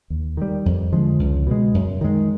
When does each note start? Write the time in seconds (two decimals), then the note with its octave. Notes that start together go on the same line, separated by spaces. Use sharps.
0.10 D#2
0.37 D#3 G3
0.66 F2
0.92 D3 F3 G#3
1.19 C#2
1.47 B2 G#3
1.74 F#2
2.01 D#3 G#3